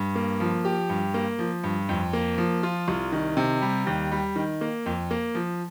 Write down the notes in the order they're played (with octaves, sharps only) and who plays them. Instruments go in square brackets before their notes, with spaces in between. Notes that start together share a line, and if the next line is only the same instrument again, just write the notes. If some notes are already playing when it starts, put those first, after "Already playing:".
Already playing: [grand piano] G2
A#3
F3
G4
G2
A#3
F3
G2
F2
A#3
F3
F4
C2
D#3
C3
G3
D#2
G3
D#3
A#3
F2
A#3
F3